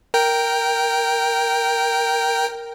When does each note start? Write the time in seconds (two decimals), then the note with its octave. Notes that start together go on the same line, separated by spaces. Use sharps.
0.14 A#4 G5